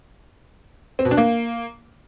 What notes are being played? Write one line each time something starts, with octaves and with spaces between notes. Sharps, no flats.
C4
B2
D4
A#3